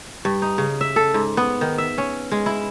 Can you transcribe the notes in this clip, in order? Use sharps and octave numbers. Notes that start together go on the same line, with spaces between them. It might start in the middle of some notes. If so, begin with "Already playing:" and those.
G2
D#4
C#3
E5
A4
G#2
B3
D#3
E5
C#4
G#3
E4